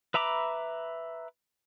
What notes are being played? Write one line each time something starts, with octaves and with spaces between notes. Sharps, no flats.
B4 E5 A#5 B5 D6